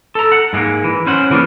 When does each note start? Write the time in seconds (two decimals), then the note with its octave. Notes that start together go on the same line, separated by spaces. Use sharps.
0.15 A4 A#5
0.32 F#5
0.53 G#2 G#3 A#3
0.84 E3
1.06 C#4 C5 F#5
1.30 C#3 E3 F3 A#3 D4